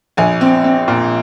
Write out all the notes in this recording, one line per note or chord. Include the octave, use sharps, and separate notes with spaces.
A#1 G#5
C4
C4
A#2